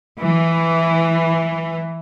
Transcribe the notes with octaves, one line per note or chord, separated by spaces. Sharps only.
E3